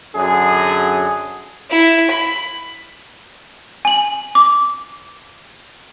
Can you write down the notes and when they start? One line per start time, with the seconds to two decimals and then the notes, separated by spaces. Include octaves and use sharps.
0.15 F#2 D3 G#4
1.70 E4
2.11 B5
3.85 G#5 F#7
4.35 D6